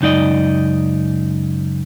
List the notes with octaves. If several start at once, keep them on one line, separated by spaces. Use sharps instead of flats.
C#2 F#2 D#4 D5 D#5